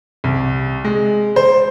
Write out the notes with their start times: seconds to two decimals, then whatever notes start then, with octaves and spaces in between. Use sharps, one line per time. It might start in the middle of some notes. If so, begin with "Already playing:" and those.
0.24 C2
0.85 G#3
1.36 C5